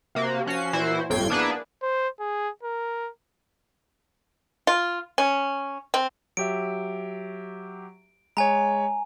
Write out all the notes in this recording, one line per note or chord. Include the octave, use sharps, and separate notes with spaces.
C3 A#3 F#4
F3 C#4 F#4 C7
A#2 E3 E4 F#4 C5
G1 F2 A2 G5 G#6 C7
A#3 B3 D4 E4 G#4 B4
C5
G#4
A#4
F4
C#4
C4
F#3 G4 E5 D7
G#3 C#5 G#5 A#5